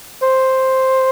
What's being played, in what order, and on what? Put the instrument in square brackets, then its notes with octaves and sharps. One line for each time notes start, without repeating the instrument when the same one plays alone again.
[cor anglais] C5